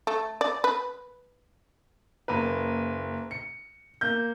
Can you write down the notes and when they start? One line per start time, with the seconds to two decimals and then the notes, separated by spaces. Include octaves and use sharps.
0.07 A3
0.41 D5
0.64 B4
2.28 F#1 A#3 B4
3.31 C#7
4.01 A#3 G6